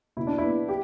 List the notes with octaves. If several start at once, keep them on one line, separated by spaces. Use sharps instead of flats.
B2 E4
D4
B3 E4
G4